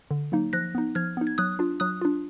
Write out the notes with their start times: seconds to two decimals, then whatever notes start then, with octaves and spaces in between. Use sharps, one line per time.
0.11 D3
0.32 F#3 A#3 D#4
0.53 F3 F#6 A#6
0.75 B3 D#4
0.95 F3 F6 G#6
1.17 B3 D#4
1.27 G#6
1.38 F#3 D#6 F#6
1.59 D4 F4
1.80 F#3 D#6 F#6
2.02 D4 F4